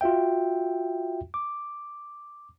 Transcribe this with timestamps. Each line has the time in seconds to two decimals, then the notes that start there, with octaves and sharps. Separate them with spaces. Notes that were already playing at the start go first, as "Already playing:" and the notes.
0.01 F4 F#4 E5 G5
1.34 D6